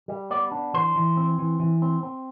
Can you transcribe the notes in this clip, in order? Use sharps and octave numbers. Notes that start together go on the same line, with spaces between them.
G3
B3 D5
D4
E3 C5
E3
C4
E3
E3
C4
C4